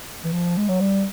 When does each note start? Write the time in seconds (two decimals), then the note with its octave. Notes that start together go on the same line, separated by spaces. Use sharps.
0.24 E3
0.33 F3
0.57 G#3
0.69 F#3
0.80 G3